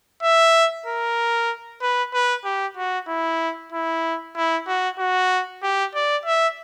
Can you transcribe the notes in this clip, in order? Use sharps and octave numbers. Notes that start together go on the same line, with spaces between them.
E5
A#4
B4
B4
G4
F#4
E4
E4
E4
F#4
F#4
G4
D5
E5